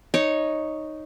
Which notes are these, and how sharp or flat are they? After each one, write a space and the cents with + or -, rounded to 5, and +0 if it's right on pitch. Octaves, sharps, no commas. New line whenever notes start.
D#4 +0 C#5 +0